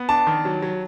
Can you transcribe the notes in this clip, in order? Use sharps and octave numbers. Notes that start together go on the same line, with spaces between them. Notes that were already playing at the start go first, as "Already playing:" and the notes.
Already playing: B3
D4 A5
D#3
F#3
F#3